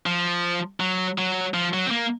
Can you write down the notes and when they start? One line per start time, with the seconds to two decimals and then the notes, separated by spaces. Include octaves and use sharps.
0.06 F3
0.80 F#3
1.18 F#3
1.54 F3
1.74 F#3
1.86 C4
1.91 A#3